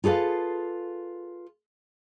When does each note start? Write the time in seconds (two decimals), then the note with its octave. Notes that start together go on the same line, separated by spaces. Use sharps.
0.04 F4 G#4 A4 B4 F5